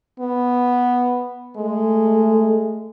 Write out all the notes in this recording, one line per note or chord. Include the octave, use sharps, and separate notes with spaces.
B3
G#3 A3